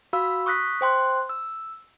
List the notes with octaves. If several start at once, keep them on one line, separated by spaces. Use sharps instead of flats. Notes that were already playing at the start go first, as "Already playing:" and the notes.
F#4 F5 B5 E6
C#6 D#6 F#6 A#6 B6
C5 G5 C6 F#6
E6